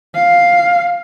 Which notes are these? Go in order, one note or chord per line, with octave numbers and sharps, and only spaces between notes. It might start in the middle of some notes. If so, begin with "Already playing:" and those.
F5